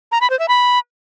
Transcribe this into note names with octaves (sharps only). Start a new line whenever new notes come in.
A#5
B5
C5
E5
B5